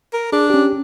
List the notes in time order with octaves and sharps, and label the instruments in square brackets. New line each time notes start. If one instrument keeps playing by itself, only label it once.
[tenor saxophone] A#4
[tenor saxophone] D4 [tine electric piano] G#4
[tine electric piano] C#4 G4